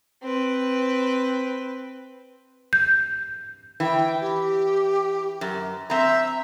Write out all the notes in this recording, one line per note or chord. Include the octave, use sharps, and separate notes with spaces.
C4 B4
G6
E3 G5
G4
F#2
C4 E5 A#5